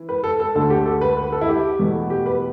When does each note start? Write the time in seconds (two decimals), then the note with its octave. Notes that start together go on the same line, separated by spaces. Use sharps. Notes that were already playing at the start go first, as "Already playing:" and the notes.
Already playing: E3
0.09 B4
0.24 A4
0.40 A4
0.55 D2 D3 A3 A4
0.70 G4
0.86 A4
1.01 B4
1.17 B4
1.32 A4
1.41 E4
1.49 G4
1.79 E2 B2 A3
2.10 G4
2.26 B4